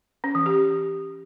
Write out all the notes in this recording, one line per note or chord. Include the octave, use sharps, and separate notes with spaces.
C#4
E3
G4